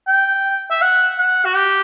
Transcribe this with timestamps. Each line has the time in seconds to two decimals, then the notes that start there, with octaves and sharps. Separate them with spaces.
0.07 G5
0.71 E5
0.82 F#5
1.19 F#5
1.46 F#4
1.56 G4